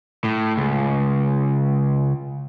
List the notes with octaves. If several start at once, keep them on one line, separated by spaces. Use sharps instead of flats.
A2
C#2